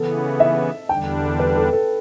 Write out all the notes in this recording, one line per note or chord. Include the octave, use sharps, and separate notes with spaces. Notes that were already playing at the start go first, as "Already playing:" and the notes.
Already playing: C#3 E3 B3 A4
E5
E2 D3 G3 D4 G5
B4
A4
A4